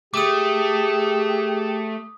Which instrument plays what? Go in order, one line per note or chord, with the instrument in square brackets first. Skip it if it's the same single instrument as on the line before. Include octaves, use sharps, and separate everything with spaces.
[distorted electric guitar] A3 [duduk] G4 [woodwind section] G#4 [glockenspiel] D6 D#6